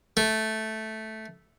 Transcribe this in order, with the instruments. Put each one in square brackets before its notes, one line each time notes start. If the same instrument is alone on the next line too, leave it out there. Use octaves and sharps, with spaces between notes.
[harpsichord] A3